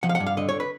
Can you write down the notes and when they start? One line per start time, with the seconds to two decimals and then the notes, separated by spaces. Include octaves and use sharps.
0.03 F3 F#5
0.09 F5
0.15 F#5
0.20 G2
0.27 F5
0.37 D3 D#5
0.49 C#5
0.60 B4